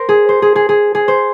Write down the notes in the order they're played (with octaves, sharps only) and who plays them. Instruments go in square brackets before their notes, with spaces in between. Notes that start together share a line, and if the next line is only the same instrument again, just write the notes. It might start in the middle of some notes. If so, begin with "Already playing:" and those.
Already playing: [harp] A#4 C5
G#4
C5
G#4
G#4
G#4
G#4
C5